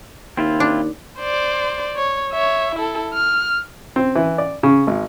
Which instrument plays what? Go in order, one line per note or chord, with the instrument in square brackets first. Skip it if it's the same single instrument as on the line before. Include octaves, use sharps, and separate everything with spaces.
[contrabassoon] D#2 [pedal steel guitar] C4 E4 F4
[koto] D4
[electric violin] C5 D5
C#5
C#5 E5
E4 A4
F6
[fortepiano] C4
E3
D5
C#3
G#1